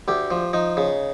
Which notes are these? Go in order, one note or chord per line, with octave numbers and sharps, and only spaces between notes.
D2 G4
F3
F3 D#4
C#3